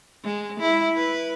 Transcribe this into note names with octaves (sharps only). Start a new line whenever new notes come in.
G#3
E4
B4